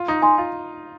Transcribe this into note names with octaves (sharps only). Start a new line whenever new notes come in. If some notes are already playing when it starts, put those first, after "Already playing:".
Already playing: F4
D#4
D#4 G#5 C6
F4